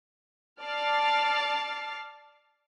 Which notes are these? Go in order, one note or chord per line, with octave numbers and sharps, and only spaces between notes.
D5 A5 F6 A6 C7